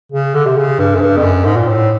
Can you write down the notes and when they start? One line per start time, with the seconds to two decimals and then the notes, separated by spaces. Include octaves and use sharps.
0.12 C#3
0.35 D3
0.46 C3
0.57 C#3
0.79 G2
0.95 F#2
1.01 G2
1.17 F2
1.24 F#2
1.45 G#2
1.56 A#2
1.68 A2